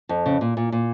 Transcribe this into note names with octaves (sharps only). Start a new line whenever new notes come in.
F2
C#3
A#2
A#2
A#2